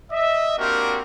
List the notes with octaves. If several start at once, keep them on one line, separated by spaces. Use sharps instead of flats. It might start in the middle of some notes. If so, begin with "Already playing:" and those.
D#5 E5
A#3 C4 D4 F#4 G4 A#4